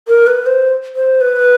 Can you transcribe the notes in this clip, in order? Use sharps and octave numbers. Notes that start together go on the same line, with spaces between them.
A#4
B4
C5
C5
B4